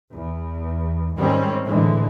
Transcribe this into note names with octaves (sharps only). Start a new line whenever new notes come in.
E2
G#2 D#3 G3 C4 C#4
A2 D3 E3 G#3